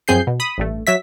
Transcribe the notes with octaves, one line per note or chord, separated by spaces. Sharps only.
F#2 F3 C4 G#4 G6 C7
B2
B5 D#6
A1 G2 A3
F#3 E5 B6